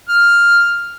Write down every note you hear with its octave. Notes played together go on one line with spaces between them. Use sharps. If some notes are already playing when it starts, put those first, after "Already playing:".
F6